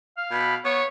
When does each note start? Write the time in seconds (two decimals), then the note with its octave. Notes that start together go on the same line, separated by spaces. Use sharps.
0.17 F5 F6
0.31 B2 B5
0.64 B3 C#5 C#6